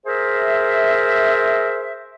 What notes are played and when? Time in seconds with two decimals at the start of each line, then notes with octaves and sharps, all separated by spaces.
0.07 G#4 A#4 C5 E5